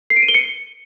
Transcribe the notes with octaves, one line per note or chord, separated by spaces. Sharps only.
C7
D7
D#7
G7
C#7